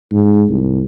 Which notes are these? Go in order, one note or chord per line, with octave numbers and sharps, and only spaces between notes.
G#2
C2